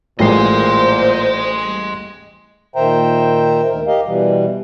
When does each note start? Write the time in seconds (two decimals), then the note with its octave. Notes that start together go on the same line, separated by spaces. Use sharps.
0.19 A1 A#2 G#3 C5 D#5 C6 C7
2.76 A#2 D#3 C5 E5 G5 A#5
3.68 D2 D#3 A#4
3.87 G4 A#4 D#5 F5
4.06 B2 E3 G3